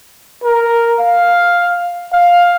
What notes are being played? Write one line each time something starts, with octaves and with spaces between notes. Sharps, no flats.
A#4
F5
F5